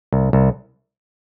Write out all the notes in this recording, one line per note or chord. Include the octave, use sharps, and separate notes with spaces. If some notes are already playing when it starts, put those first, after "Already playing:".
C2
C2